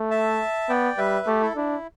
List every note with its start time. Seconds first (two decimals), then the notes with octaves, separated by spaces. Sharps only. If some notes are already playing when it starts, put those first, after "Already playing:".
Already playing: A3
0.11 E5 A5
0.69 B3 D5 G5
0.97 G3 B4 E5
1.27 A3 G4
1.42 E4 A4
1.56 D4 E4